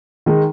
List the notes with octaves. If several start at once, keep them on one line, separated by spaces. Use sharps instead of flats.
D#3 G#3 D#4